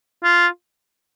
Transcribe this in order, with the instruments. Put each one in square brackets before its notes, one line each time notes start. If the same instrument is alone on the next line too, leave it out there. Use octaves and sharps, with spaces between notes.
[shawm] F4